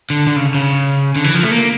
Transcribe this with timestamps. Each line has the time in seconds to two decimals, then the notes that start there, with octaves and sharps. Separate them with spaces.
0.10 D3
0.27 D3
0.36 C#3
0.54 C#3
1.16 D3
1.24 E3
1.34 F3
1.43 A3
1.51 A#3